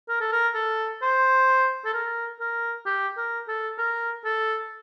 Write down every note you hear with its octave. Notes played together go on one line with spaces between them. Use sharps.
A#4
A4
A#4
A4
C5
A4
A#4
A#4
G4
A#4
A4
A#4
A4